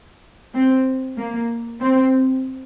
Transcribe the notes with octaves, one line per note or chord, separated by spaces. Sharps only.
C4
A#3
C4